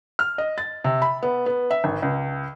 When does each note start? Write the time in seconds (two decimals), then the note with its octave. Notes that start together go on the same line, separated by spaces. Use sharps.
0.19 F6
0.38 D#5
0.58 A6
0.84 C3
1.02 B5
1.23 B3
1.46 B3
1.71 E5
1.84 G#1
2.02 C#2